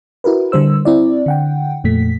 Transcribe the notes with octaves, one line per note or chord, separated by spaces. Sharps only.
E4 F#4 A#4 B4
D3 G3 C5 E6
C4 E4 D5
D3 F#5 G5
F2 A#2 A3 B6